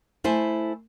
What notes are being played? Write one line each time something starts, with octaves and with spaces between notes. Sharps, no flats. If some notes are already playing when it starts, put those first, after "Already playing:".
A3 E4 C5 G#5